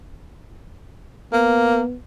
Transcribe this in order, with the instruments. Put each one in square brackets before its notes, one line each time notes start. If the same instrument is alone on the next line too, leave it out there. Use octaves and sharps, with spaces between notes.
[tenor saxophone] A#3 [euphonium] B3